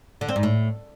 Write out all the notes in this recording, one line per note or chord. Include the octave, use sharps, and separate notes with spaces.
D3
C4
G#2
A2